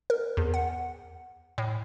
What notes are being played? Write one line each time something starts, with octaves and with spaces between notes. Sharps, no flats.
A#4
E2
F#5
A2